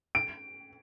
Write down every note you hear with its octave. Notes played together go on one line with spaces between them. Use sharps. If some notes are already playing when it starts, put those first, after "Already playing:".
D7